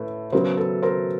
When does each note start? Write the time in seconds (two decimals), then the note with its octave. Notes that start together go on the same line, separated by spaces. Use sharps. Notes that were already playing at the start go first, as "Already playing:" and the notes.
Already playing: A2 A4 B4
0.32 C#3 F#3 B3 A#4 C5
0.57 A4 B4
0.82 A#4 C5